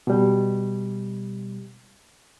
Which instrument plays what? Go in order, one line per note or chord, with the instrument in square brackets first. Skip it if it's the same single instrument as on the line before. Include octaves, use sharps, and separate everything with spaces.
[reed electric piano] B2 G3